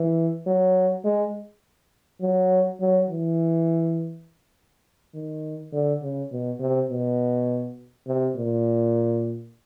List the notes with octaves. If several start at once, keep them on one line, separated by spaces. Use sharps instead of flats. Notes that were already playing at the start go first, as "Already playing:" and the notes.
Already playing: E3
F#3
G#3
F#3
F#3
E3
D#3
D3
C#3
B2
C3
B2
C3
A#2